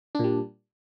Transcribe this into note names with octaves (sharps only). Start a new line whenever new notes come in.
A#2 G3 D4